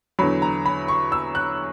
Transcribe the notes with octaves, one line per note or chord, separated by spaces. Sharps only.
E2 D3 F#3 B5
A#5
B5
C#6
E6
F#6